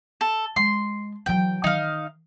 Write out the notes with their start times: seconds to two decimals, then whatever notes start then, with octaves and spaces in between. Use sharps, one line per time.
0.21 A4
0.56 G#3 C6
1.26 E3 F#3 G5
1.64 D#3 D#4 F5